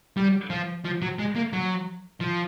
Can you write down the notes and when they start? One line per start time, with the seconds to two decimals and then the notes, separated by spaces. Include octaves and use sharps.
0.17 G3
0.50 F3
0.84 F3
1.02 F#3
1.19 G#3
1.35 A#3
1.53 F#3
2.20 F3